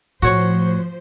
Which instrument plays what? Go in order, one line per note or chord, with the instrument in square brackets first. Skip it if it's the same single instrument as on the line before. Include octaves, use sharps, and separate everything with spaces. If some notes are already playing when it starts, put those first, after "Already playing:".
[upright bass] A2 [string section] F3 C5 [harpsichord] F#4 C#5 C#6